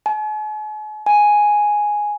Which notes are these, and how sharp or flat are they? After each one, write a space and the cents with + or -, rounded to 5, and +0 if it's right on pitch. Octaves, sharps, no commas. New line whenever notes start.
G#5 +45
G#5 +0